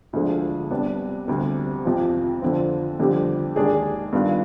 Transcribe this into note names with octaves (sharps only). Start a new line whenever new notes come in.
D2 D3 F3 G#3
C3 G3 B3 D4
D2 C3 G3
F2 C3 F3
F2 D3 F3 C4
F2 D3 G3 C4 G4
D#2 D#3 G#3 D4 G#4
G2 D#3 B3 F4